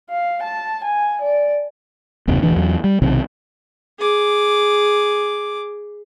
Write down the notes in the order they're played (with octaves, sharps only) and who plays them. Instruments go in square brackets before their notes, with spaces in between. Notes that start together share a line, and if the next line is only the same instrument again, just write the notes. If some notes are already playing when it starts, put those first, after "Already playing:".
[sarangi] F5
A5
G#5
D5
[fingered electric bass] F#1 D#2 C3 D#3
E1 D2 E3 D4
E2 F#3
G3
B1 C3 D#3
[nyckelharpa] G#4 D6